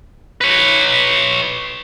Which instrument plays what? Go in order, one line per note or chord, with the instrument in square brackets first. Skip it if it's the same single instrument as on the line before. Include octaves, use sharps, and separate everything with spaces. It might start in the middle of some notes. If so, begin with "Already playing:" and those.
[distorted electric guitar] B4 C#5